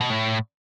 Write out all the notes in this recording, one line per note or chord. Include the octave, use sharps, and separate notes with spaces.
B2
A2